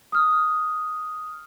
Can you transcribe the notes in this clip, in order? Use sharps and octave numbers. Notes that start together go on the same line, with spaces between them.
D#6 F6